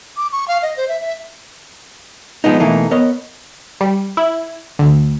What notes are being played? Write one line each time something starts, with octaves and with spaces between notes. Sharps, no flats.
D6
C#6
F5
D#5
C5
E5
E5
F3 F#3 G#3 B3 D#4
B2 E3 A3 A#3 D#4
B3 A#4 C#5 D#5
G3
E4
D2